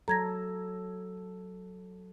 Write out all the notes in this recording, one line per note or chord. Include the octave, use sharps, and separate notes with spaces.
F#3 A4 A#5 G#6 A#6